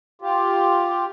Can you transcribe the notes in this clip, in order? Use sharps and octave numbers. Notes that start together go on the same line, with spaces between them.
F4 G4